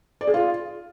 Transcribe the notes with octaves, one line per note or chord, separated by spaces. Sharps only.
D5
G#4
F4